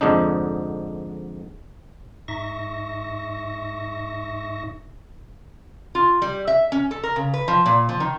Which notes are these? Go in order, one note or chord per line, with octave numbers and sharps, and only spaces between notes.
F2 G#2 D3 D4 D#4
G#2 D#4 E5 C#6 A#6
F4
G3
E5
C#4
A4
A#4
C#3
B4
F3
A#2
F3
D#3